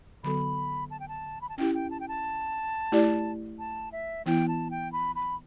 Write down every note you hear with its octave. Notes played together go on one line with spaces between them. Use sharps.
D3 F#3 B3 F#4 A4 B5
A5
G5
A5
B5
A5
C#4 E4 G4 G5
G5
A5
G5
A5
A3 E4 G4 D5
A5
E5
E3 B3 E4 G5
A5
G5
B5
B5